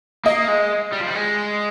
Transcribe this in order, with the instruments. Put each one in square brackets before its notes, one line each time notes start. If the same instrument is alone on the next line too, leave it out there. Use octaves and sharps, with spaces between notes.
[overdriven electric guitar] A#3 [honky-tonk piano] D#5
[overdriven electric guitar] G#3
G3
F3
G3
G#3